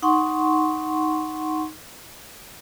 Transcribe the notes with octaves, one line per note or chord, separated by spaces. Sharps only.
D#4 F#5 C6 C#6